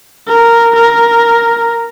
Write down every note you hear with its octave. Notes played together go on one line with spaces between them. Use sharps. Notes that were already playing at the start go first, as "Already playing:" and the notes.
A#4
A#4